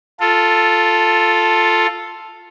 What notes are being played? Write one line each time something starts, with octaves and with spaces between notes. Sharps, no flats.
F4 A4